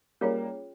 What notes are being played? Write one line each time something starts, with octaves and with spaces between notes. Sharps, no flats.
G3 A#3 C#4 F4 G#4 C#5 G5